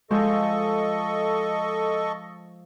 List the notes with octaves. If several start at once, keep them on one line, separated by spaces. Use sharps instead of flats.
F3 G#3 A4 C5 D#5 C#6